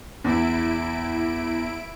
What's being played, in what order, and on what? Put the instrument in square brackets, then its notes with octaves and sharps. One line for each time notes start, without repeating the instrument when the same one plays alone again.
[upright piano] E2 [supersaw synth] E4 D7